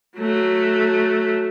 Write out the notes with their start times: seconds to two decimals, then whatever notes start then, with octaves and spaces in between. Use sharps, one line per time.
0.16 F#3 A3